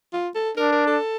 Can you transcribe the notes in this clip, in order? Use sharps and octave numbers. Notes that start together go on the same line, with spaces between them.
F4
A4
D4 A#4
A#4
A4